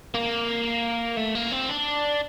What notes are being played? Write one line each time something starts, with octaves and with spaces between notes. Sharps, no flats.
A#3
A3
A#3
C4
D4